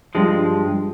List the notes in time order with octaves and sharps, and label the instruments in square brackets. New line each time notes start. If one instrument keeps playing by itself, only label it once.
[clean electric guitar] G2 F3 G#3